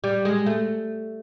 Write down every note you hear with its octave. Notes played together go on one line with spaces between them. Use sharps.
G3
G#3
A3